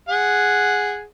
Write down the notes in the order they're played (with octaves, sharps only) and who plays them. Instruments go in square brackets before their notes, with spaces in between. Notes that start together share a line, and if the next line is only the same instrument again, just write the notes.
[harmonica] G#4 F#5